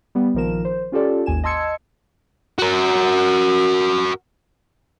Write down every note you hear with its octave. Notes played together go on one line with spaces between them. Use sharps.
G3 B3
A#1 D#3 F3 A#4 E7
C5
C#4 F4 G4 A4 D5
G#1 D#2 G#5 E7
D#5 A5 C6 E6 G#6 C#7
F#4 A#4